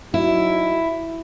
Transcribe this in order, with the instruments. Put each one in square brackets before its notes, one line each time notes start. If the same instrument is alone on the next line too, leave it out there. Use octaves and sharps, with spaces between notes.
[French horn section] F#3 D#4 F#4 [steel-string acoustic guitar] E4